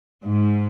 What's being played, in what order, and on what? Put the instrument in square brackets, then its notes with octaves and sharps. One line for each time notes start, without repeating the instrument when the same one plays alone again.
[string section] G#2